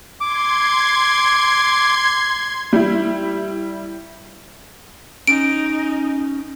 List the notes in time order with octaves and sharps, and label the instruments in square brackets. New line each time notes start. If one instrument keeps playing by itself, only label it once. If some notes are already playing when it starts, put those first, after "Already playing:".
[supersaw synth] C6 G#6 [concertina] D6
[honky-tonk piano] G3 E4
[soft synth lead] C#4 [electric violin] D#4 [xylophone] D7